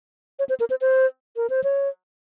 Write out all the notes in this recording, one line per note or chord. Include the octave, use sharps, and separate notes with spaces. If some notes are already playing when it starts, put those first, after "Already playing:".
C#5
C5
A#4
C5
C5
A#4
C5
C#5